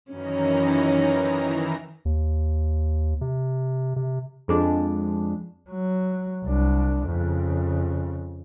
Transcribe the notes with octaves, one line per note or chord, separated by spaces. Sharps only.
F#2 D#3 E3 C#4 A#5
D#2
C3
C3
F2 G#3 D4
F#3
C2 D4
F2 C#3